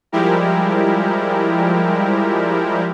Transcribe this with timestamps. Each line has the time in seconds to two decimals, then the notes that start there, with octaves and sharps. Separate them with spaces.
0.12 F3 G3 G#3 E4 G4 A#4